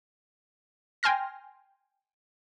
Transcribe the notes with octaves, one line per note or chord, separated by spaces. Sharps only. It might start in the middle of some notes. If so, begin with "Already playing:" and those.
G5 G#5 C6 F6 A#6